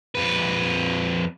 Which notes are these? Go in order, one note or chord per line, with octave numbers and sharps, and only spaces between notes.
F2 B4